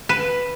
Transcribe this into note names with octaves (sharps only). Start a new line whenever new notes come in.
B4